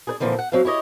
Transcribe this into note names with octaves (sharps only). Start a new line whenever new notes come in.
G#4 B4 D5
A#2 D3 E3 F3 C4
F#5
F#3 C4 C5 F5
E4 G4 C#5 D#5